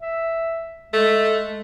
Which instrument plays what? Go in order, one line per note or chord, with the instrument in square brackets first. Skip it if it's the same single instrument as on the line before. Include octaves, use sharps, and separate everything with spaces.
[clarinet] E5
[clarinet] G#3 [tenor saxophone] A3